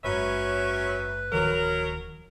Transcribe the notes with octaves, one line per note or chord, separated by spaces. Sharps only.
F#1 G#2 F#3 C#4 B4 E5
D1 D#3 F3 F#3 A#4